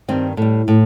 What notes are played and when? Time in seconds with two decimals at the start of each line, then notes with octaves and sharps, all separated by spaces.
0.08 G2 D#3 G3 C4
0.37 A2 G3
0.68 A2